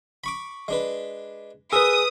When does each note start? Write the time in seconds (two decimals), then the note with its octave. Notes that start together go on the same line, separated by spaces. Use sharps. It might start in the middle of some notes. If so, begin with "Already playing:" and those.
0.24 B5 C#6 D6
0.68 G#3 D4 B4
1.73 G#4 A#4 B4 D#6 E6